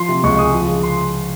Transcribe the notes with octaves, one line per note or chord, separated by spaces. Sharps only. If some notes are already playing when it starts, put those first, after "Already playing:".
Already playing: F3 C6
C3
C#2 C#6
G#3 D#6
F3
C#3
C6